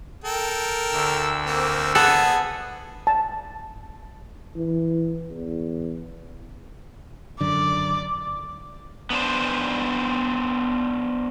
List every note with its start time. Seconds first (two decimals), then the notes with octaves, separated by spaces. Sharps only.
0.24 A4 A#4 G5
0.92 D2 E6
1.46 A#3 C4
1.95 B3 G#4 A4 F#5
3.07 A5
4.56 E3
5.30 E2
7.41 F#2 D3 D5
9.10 B3 D4 C5